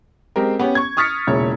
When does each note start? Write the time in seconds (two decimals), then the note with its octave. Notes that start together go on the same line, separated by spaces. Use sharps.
0.36 G#3 C4 G4 A#4
0.59 B3 C#4 G4
0.75 C#6 G#6
0.97 C#6 D#6 F6 A6 B6 C#7
1.27 E1 A#2 C#3 E4 C#5